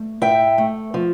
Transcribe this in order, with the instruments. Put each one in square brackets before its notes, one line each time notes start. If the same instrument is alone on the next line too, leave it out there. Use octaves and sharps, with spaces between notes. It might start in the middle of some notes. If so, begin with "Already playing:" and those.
Already playing: [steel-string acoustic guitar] A3
A2 E5 G5
A3
F3